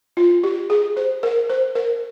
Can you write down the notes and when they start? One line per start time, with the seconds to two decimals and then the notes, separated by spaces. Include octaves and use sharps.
0.17 F4
0.43 G4
0.70 G#4
0.97 C5
1.23 A#4
1.50 C5
1.75 A#4